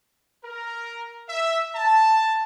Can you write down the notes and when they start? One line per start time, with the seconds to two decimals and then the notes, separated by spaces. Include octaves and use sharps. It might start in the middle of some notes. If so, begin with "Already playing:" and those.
0.44 A#4
1.29 E5
1.76 A5